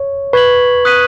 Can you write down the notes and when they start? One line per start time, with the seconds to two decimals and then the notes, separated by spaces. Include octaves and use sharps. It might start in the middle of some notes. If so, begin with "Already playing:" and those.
Already playing: C#5
0.33 B4 C#6 G#6 B6 F#7
0.85 D#6 F#6 B6 D#7 F#7